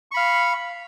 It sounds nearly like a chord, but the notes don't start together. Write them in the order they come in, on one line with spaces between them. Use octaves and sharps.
C#6 B5 F5